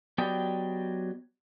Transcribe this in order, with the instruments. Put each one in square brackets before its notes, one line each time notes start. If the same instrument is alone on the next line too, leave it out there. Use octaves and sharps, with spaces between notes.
[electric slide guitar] F#3 B3 G4 D5 D#5 G5